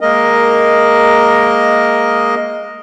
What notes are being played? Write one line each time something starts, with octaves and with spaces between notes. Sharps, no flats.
G#3 A#3 A#4 D#5